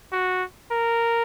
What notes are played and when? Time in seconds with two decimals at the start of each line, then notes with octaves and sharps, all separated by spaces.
0.12 F#4
0.72 A#4